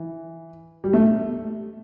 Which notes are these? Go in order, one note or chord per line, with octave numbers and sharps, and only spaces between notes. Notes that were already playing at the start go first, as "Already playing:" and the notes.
Already playing: E3
G3
A3